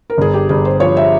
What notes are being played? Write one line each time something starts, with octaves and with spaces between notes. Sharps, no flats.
A#4
G1 G#4
G4
G1 G#4
C5
F3 C#5
E5